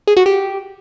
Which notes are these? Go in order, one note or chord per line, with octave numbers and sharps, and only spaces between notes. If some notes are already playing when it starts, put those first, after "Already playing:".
G#4
F#4
G4